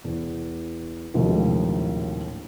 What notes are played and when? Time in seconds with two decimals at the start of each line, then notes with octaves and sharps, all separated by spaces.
0.04 E2
1.14 A#1 D#2 A2 C3 F#3 G#3